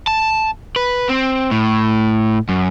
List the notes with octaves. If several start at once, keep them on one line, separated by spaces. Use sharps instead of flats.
A5
B4
C4
A2
F#2